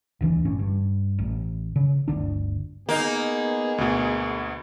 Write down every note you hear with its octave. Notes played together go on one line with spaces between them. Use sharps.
D#1 D2 E3 D4
G1 A2 D3 C#4
G2
A1
C#3
G1 D2 D3 D4
A#3 B3 D#4 G#4
D2 B2